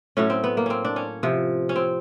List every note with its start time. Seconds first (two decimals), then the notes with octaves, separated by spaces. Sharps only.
0.17 A2 F#3 C#4
0.30 C4
0.44 B3
0.57 A#3
0.66 C4 C#4
0.85 D4
0.96 C#4
1.23 C3 F3
1.69 C#4
1.76 C4